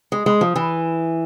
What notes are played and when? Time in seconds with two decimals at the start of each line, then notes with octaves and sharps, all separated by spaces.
0.12 G#3
0.26 G#3
0.41 F3
0.56 E3